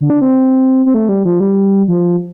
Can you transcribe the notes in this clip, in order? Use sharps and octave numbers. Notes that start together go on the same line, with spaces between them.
D3
D4
C4
C4
A3
G3
F3
G3
F3